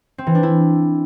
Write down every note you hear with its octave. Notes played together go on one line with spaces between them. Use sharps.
C4
E3
D4
E4